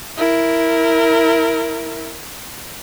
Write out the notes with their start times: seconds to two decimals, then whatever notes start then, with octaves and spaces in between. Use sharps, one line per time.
0.18 E4 A#4